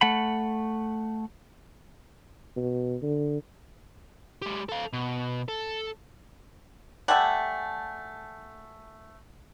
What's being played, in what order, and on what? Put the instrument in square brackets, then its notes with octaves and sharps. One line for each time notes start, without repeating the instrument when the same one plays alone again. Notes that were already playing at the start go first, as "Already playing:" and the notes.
[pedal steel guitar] A3 F#5 B5
[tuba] B2
D3
[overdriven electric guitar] G#3 G4
A4 F5
B2
A4
[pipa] G3 A3 E5 [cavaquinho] F#5 G#5 A5